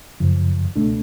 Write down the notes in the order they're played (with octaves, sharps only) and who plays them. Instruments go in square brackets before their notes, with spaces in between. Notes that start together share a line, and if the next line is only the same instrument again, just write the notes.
[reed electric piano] F#2 C#3 F3
C#2 B2 A3 D4